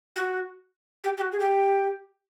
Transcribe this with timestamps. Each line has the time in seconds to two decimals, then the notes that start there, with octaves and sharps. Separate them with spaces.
0.16 F#4
1.04 G4
1.17 G4
1.21 F#4
1.32 G#4
1.40 G4